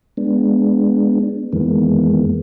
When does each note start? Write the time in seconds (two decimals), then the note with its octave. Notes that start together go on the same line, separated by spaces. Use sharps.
0.17 G#3 B3 D4
1.53 F2 D#3 E3 G#3 A#3 B3